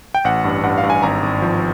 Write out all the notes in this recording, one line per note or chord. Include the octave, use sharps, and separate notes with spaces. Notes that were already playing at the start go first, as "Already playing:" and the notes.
G5
A1 F#5
G2
G2 F#5
F5
G2
G#5
G#1 A#5
G#1
F3